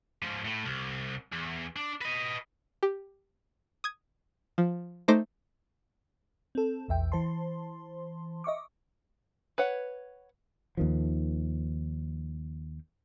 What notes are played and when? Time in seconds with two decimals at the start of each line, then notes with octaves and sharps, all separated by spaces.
0.23 G#2 F3
0.45 A2 A3
0.65 C2
1.33 E2
1.77 D4
2.01 B4 D#5
2.83 G4
3.84 D#6 G#6
4.58 F3
5.08 A3 D#4 C5 D6 A#6
6.55 C4 A4
6.88 A#1 E2 E5 G5
7.12 E3 C5 A5 C6
8.44 D#5 E5 C#6 D6
9.58 B4 C#5 F#5
10.77 D#2 D#3 F3